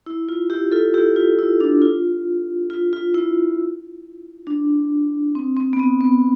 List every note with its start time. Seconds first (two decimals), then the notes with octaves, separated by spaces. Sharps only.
0.06 E4
0.29 F4
0.50 E4 G4
0.72 F4 A4
0.94 E4 G4
1.16 F4
1.39 E4
1.60 D4
1.82 F4
2.70 F4
2.93 F4
3.14 E4
4.47 D4
5.35 C4
5.57 C4
5.73 B3
5.79 C4
6.01 B3